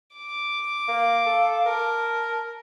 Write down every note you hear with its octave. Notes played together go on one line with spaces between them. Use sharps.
D6
A#3 F5
A4
A#4 A5